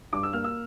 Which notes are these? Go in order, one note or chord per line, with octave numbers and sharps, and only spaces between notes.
G2 D6
E6
A#3 F6
E6